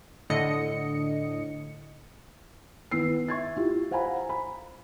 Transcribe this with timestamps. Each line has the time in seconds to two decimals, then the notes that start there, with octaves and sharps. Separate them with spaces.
0.30 A2 D3 D#5 C#7
2.91 D#3 B3 E4 E6 C7
3.28 E5 C#6 G#6 A6
3.57 E4 F4 G4
3.91 C5 F5 F#5 G#5 A#5 B5
4.29 B5